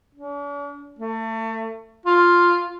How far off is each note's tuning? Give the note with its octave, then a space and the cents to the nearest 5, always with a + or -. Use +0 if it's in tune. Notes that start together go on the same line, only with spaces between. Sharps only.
D4 -45
A3 +30
F4 +0